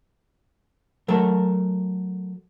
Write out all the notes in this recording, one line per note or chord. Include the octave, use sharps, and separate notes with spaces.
F#3 A3 A4 A#4